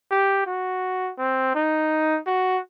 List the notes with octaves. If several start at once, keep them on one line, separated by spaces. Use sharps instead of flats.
G4
F#4
C4
D#4
F#4